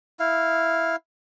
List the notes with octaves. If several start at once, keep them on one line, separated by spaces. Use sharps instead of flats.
E4 F5